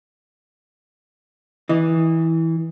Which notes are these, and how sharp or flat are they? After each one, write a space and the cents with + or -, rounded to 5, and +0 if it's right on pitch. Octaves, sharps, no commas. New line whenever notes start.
E3 -15 D#5 +0